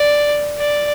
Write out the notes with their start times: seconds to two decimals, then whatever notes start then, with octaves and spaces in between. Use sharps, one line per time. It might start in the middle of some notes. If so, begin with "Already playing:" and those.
Already playing: D5
0.58 D5